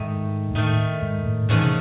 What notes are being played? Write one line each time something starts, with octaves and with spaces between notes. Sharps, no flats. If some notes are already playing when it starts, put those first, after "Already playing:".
Already playing: G#2 D#3 A3 D#4
G#2
A2 D#3 A3 D#4
G#2
A2
E2 A2 C#3 E3 A3 D#4
C3